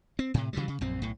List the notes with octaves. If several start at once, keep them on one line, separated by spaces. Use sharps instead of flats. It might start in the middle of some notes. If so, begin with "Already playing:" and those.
C4
A2 C3
C#3 E3 F#3 G3
C#3
A#1 F#2 C4
B1 A2